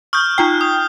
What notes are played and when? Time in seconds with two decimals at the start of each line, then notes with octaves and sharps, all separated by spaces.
0.13 C#6 D#6 F6 G6
0.38 D#4 F4 G5
0.61 D#6